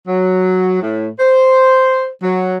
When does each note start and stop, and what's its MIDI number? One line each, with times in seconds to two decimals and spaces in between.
0.07 0.79 54
0.81 1.09 45
1.19 2.08 72
2.23 2.57 54